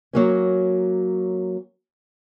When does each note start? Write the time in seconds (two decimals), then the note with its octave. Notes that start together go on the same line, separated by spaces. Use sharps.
0.13 F#3 A#3 C#4